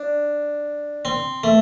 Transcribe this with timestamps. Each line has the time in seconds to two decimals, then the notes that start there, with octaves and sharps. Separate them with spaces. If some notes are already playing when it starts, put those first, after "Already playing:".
Already playing: D4
1.05 C4
1.44 A3